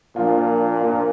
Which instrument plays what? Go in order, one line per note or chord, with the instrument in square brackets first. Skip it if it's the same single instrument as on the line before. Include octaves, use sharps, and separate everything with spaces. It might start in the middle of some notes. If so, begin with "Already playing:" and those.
[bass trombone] A#2 [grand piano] F3 A#3 D4 F4
[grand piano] F3 A#3 D4 F4